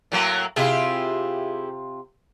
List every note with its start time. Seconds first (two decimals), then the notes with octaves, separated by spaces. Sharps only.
0.12 A2 F#3 A#3
0.56 C3 E4 F4 G4 G#4